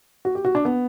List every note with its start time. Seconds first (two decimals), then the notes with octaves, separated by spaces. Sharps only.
0.25 F#4
0.35 G4
0.45 F#4
0.55 D4
0.65 B3